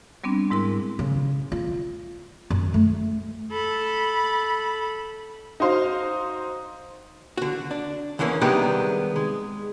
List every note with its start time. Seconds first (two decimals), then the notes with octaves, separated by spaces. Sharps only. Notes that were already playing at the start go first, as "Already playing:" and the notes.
0.24 G3 B3 C4 D4
0.50 G#2 G#3 E4 A#4 C6
0.99 C#3
1.52 F4
2.50 F#2
2.74 A3
3.51 A4 B5
5.60 D#4 F#4 C5 F5
7.37 D3 F#4
7.71 D4
8.19 E2 D3 E3 A#3 C#4
8.41 C3 D#3 G3 G#3 B3 D4
9.16 G#3